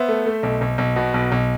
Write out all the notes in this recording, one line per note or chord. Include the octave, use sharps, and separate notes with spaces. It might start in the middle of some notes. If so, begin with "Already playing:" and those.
Already playing: B3 C5 E5
A3
A3
B1
B1
B1
B2
B1
B1